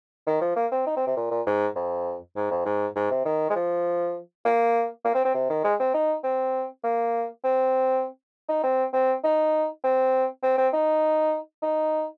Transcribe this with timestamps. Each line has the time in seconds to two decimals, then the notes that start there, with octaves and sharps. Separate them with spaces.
0.27 D#3
0.41 F3
0.56 A#3
0.72 C4
0.87 D#4
0.96 C4
1.07 C3
1.17 A#2
1.31 A#2
1.46 G#2
1.76 F2
2.36 G#2
2.51 F2
2.66 G#2
2.96 G#2
3.11 C3
3.25 D#3
3.50 G#3
3.56 F3
4.45 A#3
5.05 A#3
5.14 C4
5.25 C4
5.34 C3
5.50 D#3
5.64 G#3
5.80 C4
5.94 D#4
6.24 C4
6.84 A#3
7.44 C4
8.49 D#4
8.63 C4
8.93 C4
9.24 D#4
9.84 C4
10.43 C4
10.58 C4
10.73 D#4
11.62 D#4